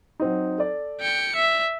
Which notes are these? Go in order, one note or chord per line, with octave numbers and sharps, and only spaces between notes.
F#3 C4 D#4
A4 D5
G5 C#7
E5